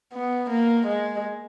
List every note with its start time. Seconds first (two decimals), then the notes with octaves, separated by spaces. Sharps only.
0.14 B3
0.50 A#3
0.87 G#3